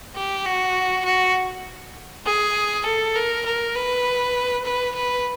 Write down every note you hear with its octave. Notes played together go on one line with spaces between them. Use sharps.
G4
F#4
F#4
G#4
A4
A#4
A#4
B4
B4
B4